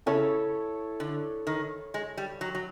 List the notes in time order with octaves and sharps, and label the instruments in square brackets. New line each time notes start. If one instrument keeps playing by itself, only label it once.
[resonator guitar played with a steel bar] C#3 [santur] E4 A4 C#5 E5
[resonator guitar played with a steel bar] D3
D#3
G#3
G3
F#3
F#3